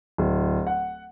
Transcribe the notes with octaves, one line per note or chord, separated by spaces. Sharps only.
D1
F#5